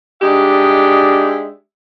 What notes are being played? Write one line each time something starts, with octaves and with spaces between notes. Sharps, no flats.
G#3 D4 D#4 G4 D#5 E5